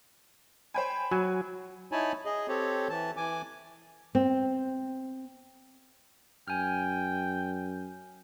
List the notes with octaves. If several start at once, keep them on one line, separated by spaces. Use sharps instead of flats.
C5 G5 G#5 B5
F#3 G#5
D#4 E4 C#5 G#5 A5 B5
G#4 D#5
C4 G4 A4 C#5
E3 A5
E3 G#5 D6
C4
F#2 G5 G#5 F6